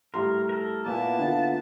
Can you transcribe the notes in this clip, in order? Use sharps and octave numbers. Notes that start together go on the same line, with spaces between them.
A2 G3 A#4 C6
A4 A#4
A#2 A#3 B3 E4 A5
D3 F4